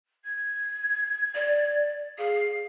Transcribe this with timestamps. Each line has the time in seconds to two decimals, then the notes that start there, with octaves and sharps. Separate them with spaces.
0.24 G#6
1.35 D5
2.18 G#4 F5